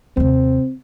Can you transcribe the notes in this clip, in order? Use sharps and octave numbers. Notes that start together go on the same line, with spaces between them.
D#2 C3 C4